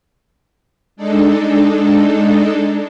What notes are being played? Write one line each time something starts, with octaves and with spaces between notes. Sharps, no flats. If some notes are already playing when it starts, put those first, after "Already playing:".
G#3 D4 D#4 A4